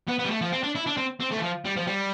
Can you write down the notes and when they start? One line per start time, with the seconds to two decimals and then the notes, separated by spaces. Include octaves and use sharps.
0.08 B3
0.19 B3
0.25 G3
0.30 A3
0.41 F3
0.52 C4
0.63 D4
0.75 E4
0.87 D4
0.97 C4
1.20 C4
1.31 A3
1.38 E3
1.42 F3
1.65 G3
1.76 F3
1.87 G3